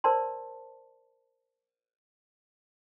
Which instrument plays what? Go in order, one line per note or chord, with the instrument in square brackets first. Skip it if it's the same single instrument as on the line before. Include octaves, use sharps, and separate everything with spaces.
[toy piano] A#4 C5 D5 A5 C6